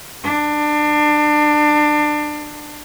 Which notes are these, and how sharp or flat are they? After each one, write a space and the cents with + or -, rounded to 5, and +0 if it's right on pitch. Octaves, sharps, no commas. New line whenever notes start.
D4 +25